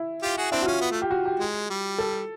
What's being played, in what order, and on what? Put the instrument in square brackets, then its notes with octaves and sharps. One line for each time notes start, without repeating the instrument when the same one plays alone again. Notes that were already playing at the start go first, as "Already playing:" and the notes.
Already playing: [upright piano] E4
[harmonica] F4 G4
F#4 G#4
[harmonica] C4 D4 [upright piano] E4
[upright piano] F#4
[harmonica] C#4 [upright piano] F4
[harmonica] B3
A3
[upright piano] G4
F#4
G4
[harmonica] G#3
G3
[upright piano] A4